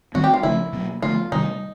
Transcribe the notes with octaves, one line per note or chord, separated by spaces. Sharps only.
D#3 G3 C4 F#4
G4
F4
C#3 F3 A3 C#4 E4
B2 F#3 A#3
D3 F3 A3 F4
C3 D#3 G3 D#4